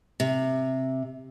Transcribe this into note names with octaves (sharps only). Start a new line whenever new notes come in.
C3